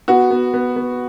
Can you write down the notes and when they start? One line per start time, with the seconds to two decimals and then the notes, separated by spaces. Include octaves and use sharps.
0.08 B3 F#4
0.31 B3
0.54 B3
0.76 B3